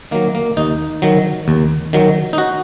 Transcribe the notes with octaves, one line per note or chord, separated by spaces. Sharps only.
D#3 F#3 A#3
A#3
D#2 D#4
D#3 F#3
D#2
D#3 F#3
D#4
F#4